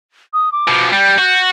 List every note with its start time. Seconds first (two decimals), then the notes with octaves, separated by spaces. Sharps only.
0.33 D#6
0.52 D6
0.68 B2 F3
0.93 G3 G6
1.19 F#4